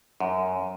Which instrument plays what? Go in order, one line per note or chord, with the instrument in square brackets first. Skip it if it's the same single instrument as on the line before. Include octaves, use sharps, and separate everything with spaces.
[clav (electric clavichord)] F#2